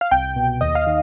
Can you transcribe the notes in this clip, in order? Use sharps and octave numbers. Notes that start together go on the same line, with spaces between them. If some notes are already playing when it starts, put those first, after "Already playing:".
F5
C2 G5
B2
D#2 D#5
F5
D#3